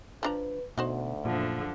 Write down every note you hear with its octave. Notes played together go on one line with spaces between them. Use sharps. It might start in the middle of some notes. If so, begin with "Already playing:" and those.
F3 D4 B4 A#5
D2 B2 D#4 F#4 C5
F#2 A#2 D3 F3